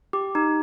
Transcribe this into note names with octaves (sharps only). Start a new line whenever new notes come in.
G4
D#4